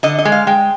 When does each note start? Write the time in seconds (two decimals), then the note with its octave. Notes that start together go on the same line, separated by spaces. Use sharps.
0.03 D3 D#5
0.19 D#5
0.25 G#3
0.32 F5
0.47 G#3 G5